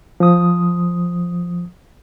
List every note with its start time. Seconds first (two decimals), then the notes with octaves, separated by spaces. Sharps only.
0.20 F3 D#6